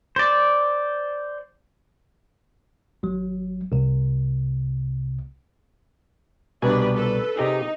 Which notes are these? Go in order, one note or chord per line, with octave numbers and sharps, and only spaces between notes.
C5 D5
G#1 F#3
C2 C3
C2 B2 D4 G4 B4 G#5
A4 B4
C3 D#4 G4 G#4